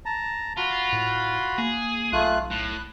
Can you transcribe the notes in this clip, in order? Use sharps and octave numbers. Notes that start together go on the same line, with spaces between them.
A5 A#5
F4 F#4 B5
A2
A#3 G#4
B1 A3 F4 F#6
A2 F#6